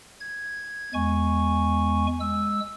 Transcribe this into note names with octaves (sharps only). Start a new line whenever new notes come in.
G#6
E2 G#3 G#5 C#6
G#3 E6